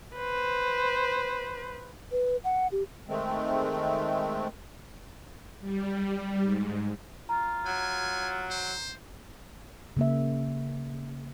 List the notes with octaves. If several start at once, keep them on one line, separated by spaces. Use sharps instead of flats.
B4 C5
B4
F#5
G4
D#3 G#3 A3 C4
G3
G#2
F4 A#5
F#3 G#5
C5
C#3 A#3 E5